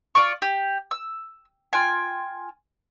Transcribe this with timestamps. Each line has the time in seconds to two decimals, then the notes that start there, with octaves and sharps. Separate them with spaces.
0.15 F4 D5 C#6
0.42 G4
0.91 E6
1.73 F4 G5 G#5